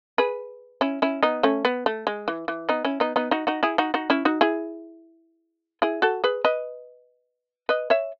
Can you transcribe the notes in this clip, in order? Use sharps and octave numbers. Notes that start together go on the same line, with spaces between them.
G#4 B4
C#4 E4
C#4 E4
B3 D#4
A3 C#4
B3
A3
G#3
E3
E3
B3 D#4
C#4 E4
B3 D#4
B3 D#4
D#4 F#4
D#4 F#4
E4 G#4
D#4 F#4
D#4 F#4
C#4 E4
D#4 F#4
E4 G#4
E4 G#4
F#4 A4
G#4 B4
B4 D#5
B4 D#5
C#5 E5